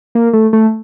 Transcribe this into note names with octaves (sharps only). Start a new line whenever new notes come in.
A#3
A3
A3